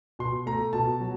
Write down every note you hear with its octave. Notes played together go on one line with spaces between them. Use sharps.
B2 C6
A3 A#5
B2 A5
F#3